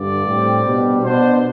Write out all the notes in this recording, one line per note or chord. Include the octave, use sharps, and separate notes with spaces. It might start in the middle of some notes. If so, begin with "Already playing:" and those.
Already playing: G2 D3 D5
A2 G3 C4
B2 G3 D4
B2 B3 D4 C5